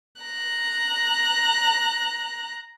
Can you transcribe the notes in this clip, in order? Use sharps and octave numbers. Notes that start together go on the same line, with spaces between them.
A#5 F#6